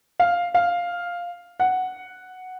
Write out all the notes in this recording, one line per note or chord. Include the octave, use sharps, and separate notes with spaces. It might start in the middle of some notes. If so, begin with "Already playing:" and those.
F5
F5
F#5